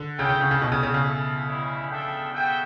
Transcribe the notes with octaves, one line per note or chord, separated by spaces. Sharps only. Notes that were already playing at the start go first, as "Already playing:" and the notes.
Already playing: D3
C#3 C#4 F#4 C#5 G5
C#3
C#3
C#3
B2 A3 D4 F#4 C#5 G5
C#3
C#3
C#3
C#4 E4 A4
G3 C#4 E4
D4 A4 E5 G5
F#4 A4 E5 G5